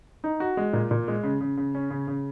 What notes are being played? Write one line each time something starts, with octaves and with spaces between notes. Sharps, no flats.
D#4
F#4
G#3
A#2
A#2
G#3
C#3
C#3
C#3
C#4
C#3
C#3